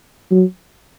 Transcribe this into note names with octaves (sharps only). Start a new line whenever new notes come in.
F#3